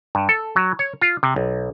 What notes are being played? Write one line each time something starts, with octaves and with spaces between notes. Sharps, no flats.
G2
A4
F#3
C#5
F4
C3
B1